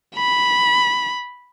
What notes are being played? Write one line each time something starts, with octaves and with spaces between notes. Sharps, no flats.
B5